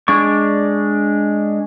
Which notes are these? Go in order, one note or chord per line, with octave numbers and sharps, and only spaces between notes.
G#3 D4 D5 C#6